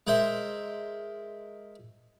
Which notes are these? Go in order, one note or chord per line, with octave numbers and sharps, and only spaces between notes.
G#3 A#4 C5 E5